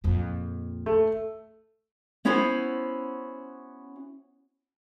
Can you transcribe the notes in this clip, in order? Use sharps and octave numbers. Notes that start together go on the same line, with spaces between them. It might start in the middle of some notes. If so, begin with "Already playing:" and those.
A#1 F2
A3
B3 C#4 E4 F#4 C5 C#5